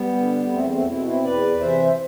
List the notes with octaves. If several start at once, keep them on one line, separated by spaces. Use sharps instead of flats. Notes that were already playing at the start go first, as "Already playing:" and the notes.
Already playing: G3 B3
D3
E2 A3 C4
A3 C4
B2 C4 E4
C4 E4
E2 B4 D5
C3 E3 C5 E5